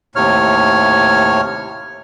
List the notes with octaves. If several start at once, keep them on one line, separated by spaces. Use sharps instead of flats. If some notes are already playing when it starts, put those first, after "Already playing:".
D#2 A2 C3 C#5 F6